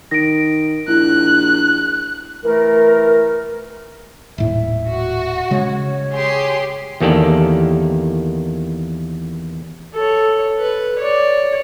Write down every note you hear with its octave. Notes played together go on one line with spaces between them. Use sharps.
D#3 A#6 D7
A#1 E4 F#6
E3 A3 A#4
D#1 A2 E5
F#4
C#3 G#3 C#5
G4 G#4 C6
E2 D#3 A#3 G4 A4 D5
A4 C#5
B4
C#5 D5